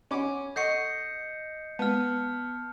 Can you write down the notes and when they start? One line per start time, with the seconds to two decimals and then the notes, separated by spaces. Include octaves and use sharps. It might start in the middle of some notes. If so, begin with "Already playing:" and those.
0.11 C#4 F#5 B5 D6
0.56 A4 D#5 F#5 C#6 G6 C7 C#7
1.79 G#3 B3 A5 F6